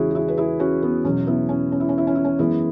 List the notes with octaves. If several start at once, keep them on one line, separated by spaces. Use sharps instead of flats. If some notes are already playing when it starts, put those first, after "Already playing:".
Already playing: E2 C#3 G#3 C#4 E4 F#4 G#4
F#4
E4 G#4
B4
E4 G#4
C#4 F#4
B3
E2 B2 F#3 C#4
B3 E4
C#4
C#4
E4
C#4
E4
C#4
E4
C#4
F#2 E3 G#3 B3 E4